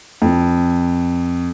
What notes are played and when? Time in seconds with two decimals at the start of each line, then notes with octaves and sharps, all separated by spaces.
0.22 F2